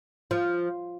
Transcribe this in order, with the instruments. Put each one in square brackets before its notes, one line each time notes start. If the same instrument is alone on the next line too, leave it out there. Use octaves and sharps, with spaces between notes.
[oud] F3